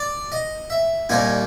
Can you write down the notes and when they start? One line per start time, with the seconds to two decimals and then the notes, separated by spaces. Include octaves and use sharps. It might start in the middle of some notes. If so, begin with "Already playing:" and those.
Already playing: D5
0.32 D#5
0.70 E5
1.09 C2 A#2 G3 A#3 D#4 G#5